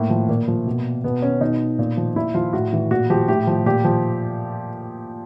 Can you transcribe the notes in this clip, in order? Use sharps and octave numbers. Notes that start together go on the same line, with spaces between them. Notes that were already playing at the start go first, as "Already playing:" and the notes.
Already playing: A2 A#3
F3
A#2 A#3
F3
B2
B2 B3
C#4
B2 D#4
A#2
F3
A#2 E4
F3 F4
A2 F#4
E3
A#2 F#4
F3 G4
A2 G4
F3
A#2 G4
F3